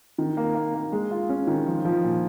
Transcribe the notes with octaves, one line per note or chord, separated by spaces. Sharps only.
D#3
A#3
A#3
A#3
G#3
F4
C#4
D#3
F3
F3
A#2